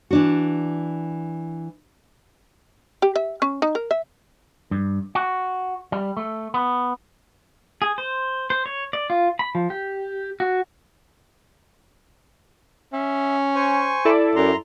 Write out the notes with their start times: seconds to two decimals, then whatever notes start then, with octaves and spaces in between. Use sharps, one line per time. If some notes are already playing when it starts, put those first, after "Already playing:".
0.11 E3 D4 F#4
3.02 G4
3.16 E5
3.42 C#4
3.62 D#4
3.75 A#4
3.91 E5
4.71 G2
5.15 F#4
5.92 G3
6.17 A3
6.54 B3
7.82 G#4
7.98 C5
8.50 C5
8.66 C#5
8.93 D5
9.10 F4
9.39 B5
9.55 F3
9.70 G4
10.40 F#4
12.93 C#4 E5
13.55 C5 G#5 C#6
14.05 E4 A4 D5
14.36 F#2 A#5 C6